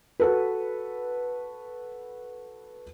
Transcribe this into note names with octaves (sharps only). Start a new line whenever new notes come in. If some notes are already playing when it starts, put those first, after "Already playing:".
F#4 A4 B4